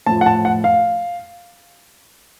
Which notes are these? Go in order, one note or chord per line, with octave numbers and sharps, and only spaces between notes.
A2 F3 A5
F#5
A5
F#5
F5